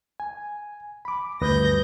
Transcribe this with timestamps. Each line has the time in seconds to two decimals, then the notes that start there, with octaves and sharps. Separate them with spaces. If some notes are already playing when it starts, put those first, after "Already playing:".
0.20 G#5
1.05 B5 D6
1.41 D2 G2 B4 D#6 G6 A#6